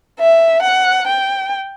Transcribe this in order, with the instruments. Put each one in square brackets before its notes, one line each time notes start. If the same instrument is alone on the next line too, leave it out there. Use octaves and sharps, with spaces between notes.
[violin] E5
F#5
G5